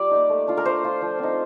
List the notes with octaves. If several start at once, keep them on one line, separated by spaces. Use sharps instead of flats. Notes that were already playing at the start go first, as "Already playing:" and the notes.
Already playing: G3 F4 D5
A#3 D#4
A3
D4 F4
A#4
A3 C5
D4 F4
F3
C4 D#4